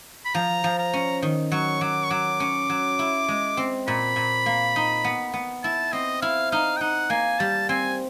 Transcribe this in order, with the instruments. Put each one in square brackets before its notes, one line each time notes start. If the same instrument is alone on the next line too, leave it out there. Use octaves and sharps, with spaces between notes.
[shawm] B5
[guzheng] F3 [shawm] A#5
[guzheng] F3
[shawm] A#5
[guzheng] C#4
D#3
[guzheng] F#3 [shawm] C#6
[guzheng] F#3 [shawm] D6
[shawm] C#6
[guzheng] F#3 [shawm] D6
[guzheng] C#4
F#3
E4
G#3
C4
[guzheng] A#2 [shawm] B5
[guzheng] A#2
A#3
D#4
B3
B3
[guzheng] E4 [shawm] A5
[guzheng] C4 [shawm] D#5
[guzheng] E4 [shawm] F5
[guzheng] D#4 [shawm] F5
[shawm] G5
[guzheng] D#4 [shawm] F#5
[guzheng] A#3 [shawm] G#5
[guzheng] G3 [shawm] A5
[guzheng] C4 [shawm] G#5